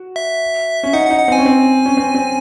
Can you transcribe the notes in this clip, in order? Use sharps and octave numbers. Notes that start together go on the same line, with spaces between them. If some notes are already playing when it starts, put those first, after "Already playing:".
Already playing: F#4
E5
C#4
D#4 F#5
F#5
D#4
F#5
C4 G#5
C#4
C4
C#4
C4
C4